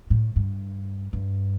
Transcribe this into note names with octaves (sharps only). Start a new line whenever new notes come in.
A2
G2
G2